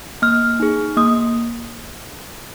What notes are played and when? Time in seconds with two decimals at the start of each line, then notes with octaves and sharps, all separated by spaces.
0.22 A#3 F6
0.60 D#4 G#4
0.97 A#3 D#6